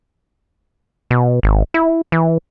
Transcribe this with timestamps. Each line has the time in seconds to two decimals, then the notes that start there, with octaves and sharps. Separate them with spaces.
1.11 B2
1.43 G#1
1.74 E4
2.12 E3